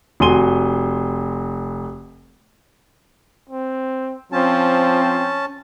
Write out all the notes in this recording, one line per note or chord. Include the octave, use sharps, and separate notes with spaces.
F1 F#4 G#5 C6 D#7 G7
C4
F3 C4 C#4 A5